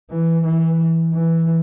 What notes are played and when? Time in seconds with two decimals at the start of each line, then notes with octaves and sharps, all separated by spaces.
0.11 E3
0.45 E3
1.14 E3